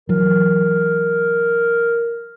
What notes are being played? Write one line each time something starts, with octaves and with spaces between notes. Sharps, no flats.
E3 F#3 A#4